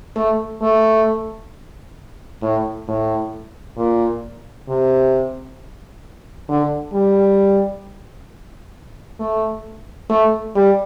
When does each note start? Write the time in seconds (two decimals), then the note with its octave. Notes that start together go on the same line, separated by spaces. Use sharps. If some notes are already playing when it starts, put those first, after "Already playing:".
0.16 A3
0.62 A3
2.42 A2
2.88 A2
3.77 A#2
4.69 C3
6.49 D3
6.93 G3
9.20 A3
10.10 A3
10.56 G3